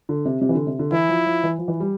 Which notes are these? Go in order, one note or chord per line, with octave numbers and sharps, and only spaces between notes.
D3
C3
C3
E3
D3
C3
D3
E3 E4
F3
F3
E3
F3
E3
G3